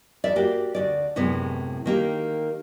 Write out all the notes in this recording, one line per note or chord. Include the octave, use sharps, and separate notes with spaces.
E2 D5 E5
A#3 F#4 G4
D2 G#2 D5
F#2 A2 C3 G#3 B3
D#3 A#3 G4